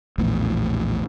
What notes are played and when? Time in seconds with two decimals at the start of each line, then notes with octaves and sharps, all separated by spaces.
0.18 A#1 E2 A2